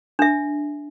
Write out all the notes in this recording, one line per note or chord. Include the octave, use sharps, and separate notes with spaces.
D4 E5